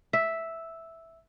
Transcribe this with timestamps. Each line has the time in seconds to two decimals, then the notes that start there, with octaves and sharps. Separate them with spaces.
0.13 E5